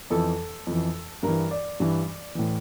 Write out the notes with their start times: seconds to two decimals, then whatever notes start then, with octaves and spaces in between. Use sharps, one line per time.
0.10 F2 E3 A4
0.67 F2 E3
1.23 G2 E3 A#4
1.51 D5
1.80 G2 E3
2.35 A2 E3